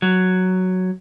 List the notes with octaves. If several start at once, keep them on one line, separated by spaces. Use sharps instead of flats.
F#3